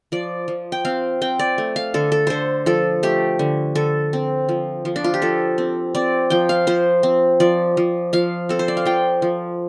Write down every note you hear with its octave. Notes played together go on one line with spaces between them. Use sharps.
F3 D5
F3
G5
C4 F5
C4 G5
D5
A3
F5
D3 A4
A4
D3 A4 C5
F3 A4
A3 G4
D3
D3 A4
C4
F3
F3
D4
F4
G4
F3 A4
C4
C4 D5
F3 G5
F5
F3 C5
C4
F3 D5
F3
F3 F5
C4 A4
C5
D5
F5
F3 G5
F3